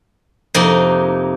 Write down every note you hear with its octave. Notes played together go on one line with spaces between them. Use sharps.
F2 C3 A#3 D#4